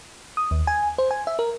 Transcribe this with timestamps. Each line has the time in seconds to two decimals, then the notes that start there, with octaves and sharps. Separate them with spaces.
0.37 D#6
0.51 D#2
0.67 G#5
0.98 C5
1.11 G#5
1.27 E5
1.39 A#4